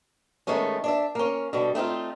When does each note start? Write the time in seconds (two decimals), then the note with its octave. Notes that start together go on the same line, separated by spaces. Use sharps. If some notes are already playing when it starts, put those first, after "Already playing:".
0.47 D#3 G#3 A3 B3 C#4
0.84 D4 D5 E5
1.15 A#3 C#4
1.53 B2 D3 G3
1.75 A3 C4 D#4 F4